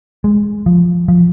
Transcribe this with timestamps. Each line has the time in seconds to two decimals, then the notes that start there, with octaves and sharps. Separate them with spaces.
0.24 G#3
0.66 F3
1.08 F3